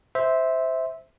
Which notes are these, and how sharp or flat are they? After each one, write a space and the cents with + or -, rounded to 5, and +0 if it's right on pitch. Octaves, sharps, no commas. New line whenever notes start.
C5 -5 E5 -15